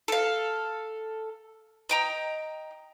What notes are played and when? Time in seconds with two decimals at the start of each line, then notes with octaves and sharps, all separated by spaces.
0.08 A4 F5
1.89 D#5 G5 A#5